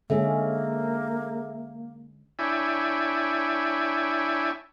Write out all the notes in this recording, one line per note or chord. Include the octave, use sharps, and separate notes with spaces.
D3 G#3 A#3 C#4 G#4 A4 E5
D4 E4 C#5 E5 G5 G#5